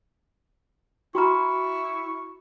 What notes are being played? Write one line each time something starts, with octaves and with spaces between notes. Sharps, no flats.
E4 F#4 G5 A#5 B5 C#6 F6